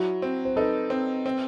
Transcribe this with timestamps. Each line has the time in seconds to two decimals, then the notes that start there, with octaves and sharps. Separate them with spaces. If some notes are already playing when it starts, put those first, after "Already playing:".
Already playing: F#3 E4 F#4
0.22 C4
0.45 C5
0.56 D#4 A4 B4
0.90 C4
1.26 C4